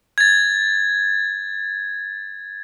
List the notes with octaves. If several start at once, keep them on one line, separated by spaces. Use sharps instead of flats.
G#6 A6